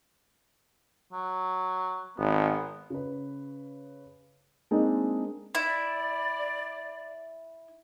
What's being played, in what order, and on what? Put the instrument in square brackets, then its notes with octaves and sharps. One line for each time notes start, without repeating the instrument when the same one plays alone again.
[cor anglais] F#3
[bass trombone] G#1 [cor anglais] B3
[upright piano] C#3 B4
G#3 A#3 C4 D4 D#4 G#4
[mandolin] E4 [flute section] D5